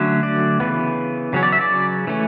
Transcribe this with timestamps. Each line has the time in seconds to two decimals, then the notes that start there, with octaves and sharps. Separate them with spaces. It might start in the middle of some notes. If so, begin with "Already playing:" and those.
Already playing: D3 F#3 A3 C#4
0.23 D5
0.60 C#3 E3 B3
1.33 C#3 F#3 C#4
1.43 D5
1.52 E5
1.61 D5
2.07 E3 A3 C#4